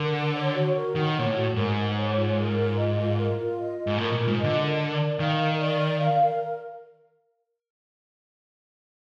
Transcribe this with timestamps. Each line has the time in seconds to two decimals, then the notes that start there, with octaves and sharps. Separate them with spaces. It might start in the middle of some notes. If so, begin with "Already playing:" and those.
Already playing: D3 A#4
0.13 F#5
0.34 C#5
0.54 F#4
0.74 A#4
0.95 D#3 F#5
1.15 A#2 C#5
1.25 A2
1.35 F#4
1.56 G#2 A#4
1.76 F#5
1.96 C#5
2.16 F4
2.37 A#4
2.57 F4
2.77 D#5
2.97 F4
3.18 A#4
3.37 F4
3.57 D#5
3.78 F4
3.87 G#2
3.98 A2 A#4
4.13 A#2
4.18 F4
4.28 G#2
4.38 D#5
4.44 D3
4.59 A#4
4.79 D5
5.00 A#4
5.19 D#3 F5
5.39 A#4
5.60 D5
5.80 A#4
6.00 F5
6.20 A#4